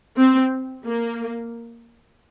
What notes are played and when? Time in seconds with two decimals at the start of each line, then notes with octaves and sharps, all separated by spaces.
0.17 C4
0.85 A#3